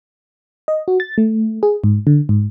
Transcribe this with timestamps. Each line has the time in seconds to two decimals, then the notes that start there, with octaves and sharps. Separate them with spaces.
0.68 D#5
0.88 F#4
1.00 A6
1.18 A3
1.63 G#4
1.84 G#2
2.07 D3
2.29 G#2